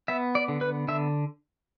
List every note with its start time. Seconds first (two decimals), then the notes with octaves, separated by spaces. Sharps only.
0.08 B3 E5
0.35 D5
0.48 D3
0.61 B4
0.88 D3 E5